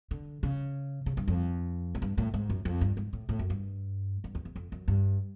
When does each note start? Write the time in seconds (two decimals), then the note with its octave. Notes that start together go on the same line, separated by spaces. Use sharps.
0.11 D3
0.43 C#3
1.06 C#3
1.17 G2
1.28 F2
1.95 G#2
2.02 G2
2.18 A2
2.34 G#2
2.50 F#2
2.65 F2
2.81 G2
2.97 G#2
3.13 A2
3.29 A2
3.39 F#2
3.50 G2
4.24 G2
4.35 E2
4.45 E2
4.56 F2
4.72 F#2
4.88 G2